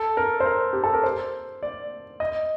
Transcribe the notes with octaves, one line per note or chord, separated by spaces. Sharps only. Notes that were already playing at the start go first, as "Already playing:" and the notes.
Already playing: A4
A#4
C5
A#4
G4
A4
A#4
C5
D5
D#5